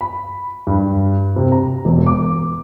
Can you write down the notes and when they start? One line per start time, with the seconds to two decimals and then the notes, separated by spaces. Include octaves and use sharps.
0.01 B5
0.67 G2
1.36 C3
1.52 A#5
1.85 E1
2.06 D6